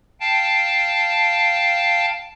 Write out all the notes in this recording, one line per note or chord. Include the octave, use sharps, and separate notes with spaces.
F5 G5 A5